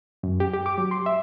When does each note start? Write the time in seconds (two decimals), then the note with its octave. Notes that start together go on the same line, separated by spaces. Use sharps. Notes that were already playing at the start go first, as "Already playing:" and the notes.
0.23 F#2
0.40 G4
0.53 G4
0.66 D6
0.78 F#3
0.91 C6
1.06 E5